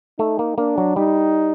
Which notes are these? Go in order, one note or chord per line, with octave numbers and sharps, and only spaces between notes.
A3 D#4
A#3
A#3 D4
F#3
G3 D#4